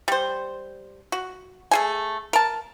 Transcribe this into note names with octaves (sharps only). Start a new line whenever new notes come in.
G3 C5
F#4
A3 G#4 G#5
A#4 A5